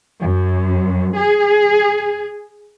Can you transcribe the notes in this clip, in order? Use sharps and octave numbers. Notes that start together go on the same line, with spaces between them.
F#2
G#4